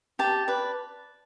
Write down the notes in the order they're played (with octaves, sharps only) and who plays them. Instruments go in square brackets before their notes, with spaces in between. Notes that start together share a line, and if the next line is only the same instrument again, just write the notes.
[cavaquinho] G4 A5
B4 D5